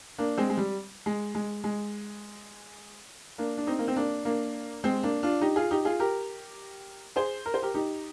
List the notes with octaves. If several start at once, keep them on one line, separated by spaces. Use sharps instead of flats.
A#3 D4
G#3 C4
G#3
G3
G#3
G#3
G#3
A#3 D4
D4
C4 D#4
A#3
C4
A#3 D4
A#3 D4
G#3 C4
A#3 D4
D4 F4
D#4 G4
F4 G#4
D#4 G4
F4 G#4
G4 A#4
G#4 C5
A#4
C5
G4 A#4
D#4 G4